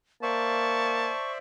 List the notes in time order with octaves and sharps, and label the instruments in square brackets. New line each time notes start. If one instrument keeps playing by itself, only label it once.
[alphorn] A#3 [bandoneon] C5 D5 E5 [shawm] A5 [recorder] C#6